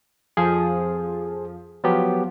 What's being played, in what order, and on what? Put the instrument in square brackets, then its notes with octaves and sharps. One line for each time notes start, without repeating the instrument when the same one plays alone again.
[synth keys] F2 F3 [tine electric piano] G#4
[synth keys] F3 [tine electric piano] F#3 B3 G4